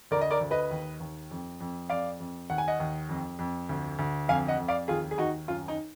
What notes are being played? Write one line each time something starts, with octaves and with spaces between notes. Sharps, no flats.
D2 A#4 D5
D#5
A#4 D5
D2
B4 D#5
D#2
D#2
F2
F2
F2 D5 F5
F2
D#2 F#5
G#5
D#5 F#5
D#2
F2
F2
D2
D2
F2 F5 G#5
D#5 F#5
F2
D5 F5
D#2 F4 G#4
G#4
D#2 D#4 F#4
F#2 F4
D#4